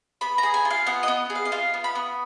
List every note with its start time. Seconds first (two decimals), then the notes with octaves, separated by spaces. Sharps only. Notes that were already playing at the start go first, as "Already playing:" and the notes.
0.21 B3 B5
0.38 A#5
0.43 G#4
0.54 G#5
0.65 F4
0.71 F5
0.87 B3 F#5
1.03 B3 D#5
1.30 G#4
1.35 F5
1.45 D#5
1.52 F4 F5
1.74 B3
1.84 B5
1.95 B3